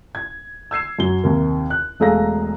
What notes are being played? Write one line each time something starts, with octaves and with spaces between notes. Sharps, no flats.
G#6
E6 G#6 C7 E7
F#2 F#3 G7
D#2 C3 A#4
F#6
E1 A3 G#4 F5 A#5 A#6